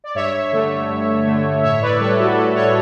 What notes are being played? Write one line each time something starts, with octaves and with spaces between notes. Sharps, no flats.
D5
G2 C#5 E5
D3 A3
G2
D3 A3
A2 C#5 E5
B4 D5
G3 A4 C#5
F#4 A4
A2 F#4 A4
A4 C#5